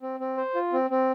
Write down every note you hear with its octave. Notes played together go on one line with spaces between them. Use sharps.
C4
C4
C5
F4
C4
C4